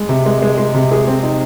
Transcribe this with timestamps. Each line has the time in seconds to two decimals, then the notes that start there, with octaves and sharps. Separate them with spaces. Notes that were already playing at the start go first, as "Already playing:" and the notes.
Already playing: G#3
0.09 C3
0.26 G#3
0.42 G#3
0.58 G#3
0.74 C3
0.91 G#4
1.08 C4
1.23 D#4